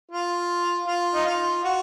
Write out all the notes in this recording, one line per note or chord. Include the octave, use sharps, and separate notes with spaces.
F4
F4
D#4
F4
F#4